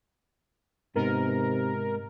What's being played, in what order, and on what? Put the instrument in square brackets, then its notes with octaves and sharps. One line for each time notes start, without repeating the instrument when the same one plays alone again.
[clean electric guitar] G#2 B3 D#4 [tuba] C3 [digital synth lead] A#4